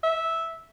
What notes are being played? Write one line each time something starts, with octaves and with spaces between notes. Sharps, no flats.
E5